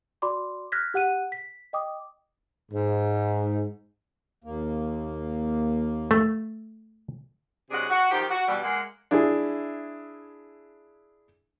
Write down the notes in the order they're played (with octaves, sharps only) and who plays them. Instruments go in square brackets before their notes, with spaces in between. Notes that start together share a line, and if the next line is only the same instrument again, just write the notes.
[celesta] F#4 D5 B5 C6 D6
F6 F#6 G#6 A#6 B6
G4 F#5 F#6 D#7
B6
D#5 G5 D6 D#6
[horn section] G#2
[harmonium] D#2 A#3
[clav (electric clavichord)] A3
[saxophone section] C3 F#3 G#3 D4 G#4 F#5
F#4
D#3 F3 G4
F#4
B2 E3 G3
G#3 A#3 F#5
[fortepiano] D4 E4 G#4